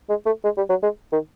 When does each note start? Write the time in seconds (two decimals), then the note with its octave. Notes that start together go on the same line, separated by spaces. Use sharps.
0.09 G#3
0.26 A3
0.44 G#3
0.57 G3
0.70 F#3
0.83 G#3
1.12 D#3